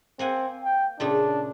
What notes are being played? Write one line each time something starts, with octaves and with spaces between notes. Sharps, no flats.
A#3 C4 F#5 G#5
G5
A#2 C#3 A3 D4